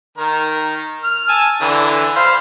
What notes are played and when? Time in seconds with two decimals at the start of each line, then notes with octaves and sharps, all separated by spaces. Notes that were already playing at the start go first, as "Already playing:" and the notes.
0.17 D#3 A#4
1.04 F6
1.29 G#5 A5 E6
1.61 D3 E3
2.16 C5 F5 B5